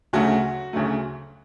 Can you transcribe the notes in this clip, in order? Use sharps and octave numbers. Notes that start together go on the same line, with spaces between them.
D2 C#3 F#3 A3 F#4
D2 C#3 F#3 A3